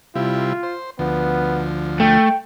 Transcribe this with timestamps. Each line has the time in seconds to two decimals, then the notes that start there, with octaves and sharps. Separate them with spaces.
0.15 C3 G3 E4 F4
0.63 C5
0.99 D2 F3 B3
2.00 A3 G5